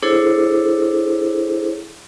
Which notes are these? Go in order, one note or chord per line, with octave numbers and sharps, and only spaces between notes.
D4 E4 G#4 A4 C5 C#5